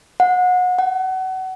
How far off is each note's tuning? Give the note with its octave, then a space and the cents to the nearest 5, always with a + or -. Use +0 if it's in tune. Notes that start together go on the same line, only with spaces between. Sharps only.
F#5 -30
F#5 +30